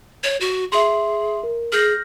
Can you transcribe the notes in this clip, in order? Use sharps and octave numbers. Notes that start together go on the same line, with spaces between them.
C#5
F#4
G#4 E5 C6
A#4
G#4 F6 G6 A#6